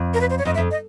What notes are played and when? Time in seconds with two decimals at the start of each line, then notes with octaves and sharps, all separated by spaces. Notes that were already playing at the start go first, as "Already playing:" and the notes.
Already playing: F2
0.14 A#4
0.21 B4
0.30 C5
0.38 C#5
0.45 F2 D#5
0.55 E5
0.57 F2
0.71 D#5